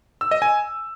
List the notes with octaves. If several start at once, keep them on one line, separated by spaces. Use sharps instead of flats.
E6
D#5
G#5